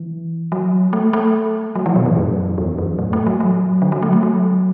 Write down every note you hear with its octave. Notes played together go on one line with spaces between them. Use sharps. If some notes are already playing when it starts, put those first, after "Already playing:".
Already playing: E3
F#3
A3
A3
F#3
E3
B2
A2
F#2
E2
F#2
A2
A3
F#3
F#3
D3
F#3
A3
A3
F#3